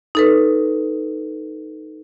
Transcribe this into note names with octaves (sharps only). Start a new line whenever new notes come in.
D#4 A4 B4